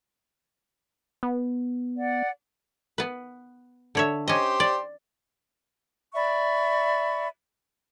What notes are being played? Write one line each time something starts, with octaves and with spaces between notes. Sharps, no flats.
B3
D5 F#5
B3 B4
D3 C#5 E5
C#4 G4 C5 D#5
D5
D5 E5 B5 C#6